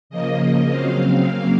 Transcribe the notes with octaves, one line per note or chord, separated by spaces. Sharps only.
C#3 F3 A#3 D#5
C#3 F#3 C4 F5
C#3 F#3 A#3